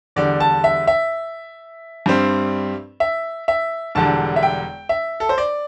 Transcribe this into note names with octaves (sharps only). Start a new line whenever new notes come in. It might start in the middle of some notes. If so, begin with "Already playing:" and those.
E2 D3 G3 D5
A5
E5
E5
G2 G3 C4
E5
E5
E1 E2 D3 G3 A5
E5
G5
E5
A4
C5
D5